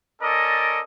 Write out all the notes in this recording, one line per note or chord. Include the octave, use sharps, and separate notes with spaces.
C#4 A4 A#4 D5 D#5